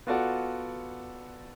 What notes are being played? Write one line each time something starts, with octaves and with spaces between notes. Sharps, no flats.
B3 F4 F#4 A4 D5 F#5